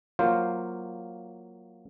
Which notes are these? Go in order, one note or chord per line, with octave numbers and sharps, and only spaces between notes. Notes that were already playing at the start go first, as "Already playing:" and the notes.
F#3 A#3 F4 C5 F5